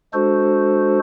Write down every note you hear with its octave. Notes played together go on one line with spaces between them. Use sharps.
G#3 D4 F#4 A4 C5